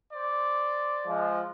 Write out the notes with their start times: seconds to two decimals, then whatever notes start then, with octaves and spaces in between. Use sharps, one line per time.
0.13 C5 D5
1.07 F3 G#3